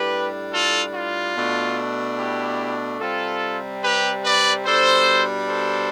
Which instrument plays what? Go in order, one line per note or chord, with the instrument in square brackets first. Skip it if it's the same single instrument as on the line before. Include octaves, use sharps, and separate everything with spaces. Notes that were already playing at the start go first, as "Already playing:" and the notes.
Already playing: [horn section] A2 G3 D4 G4 B4
F4 A4
F4
B2 A3 D4
E4 G4
C3 G3 C4 F4 A4
G4 B4
B4 D5
B2 G3 D4 A4 C5
A4 C5